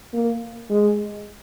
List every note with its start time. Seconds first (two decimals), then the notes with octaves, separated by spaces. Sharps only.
0.13 A#3
0.70 G#3